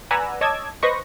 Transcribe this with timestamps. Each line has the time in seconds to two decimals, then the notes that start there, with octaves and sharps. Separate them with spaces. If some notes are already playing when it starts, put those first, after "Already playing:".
0.11 B4 D5 F#5 G#5 A#5 E6
0.41 C#5 D#5 A5 D6 E6 G#6
0.82 B4 C5 D#5 C#6 A#6